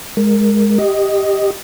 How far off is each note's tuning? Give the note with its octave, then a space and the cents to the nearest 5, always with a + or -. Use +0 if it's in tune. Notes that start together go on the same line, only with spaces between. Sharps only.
G#3 +0 A#4 +0
G4 +0 D#5 +0